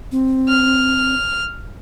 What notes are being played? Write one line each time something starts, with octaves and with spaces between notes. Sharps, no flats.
C4
F6